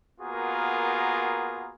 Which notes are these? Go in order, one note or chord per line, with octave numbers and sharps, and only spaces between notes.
A#3 B3 F4 F#4 G#4 A#4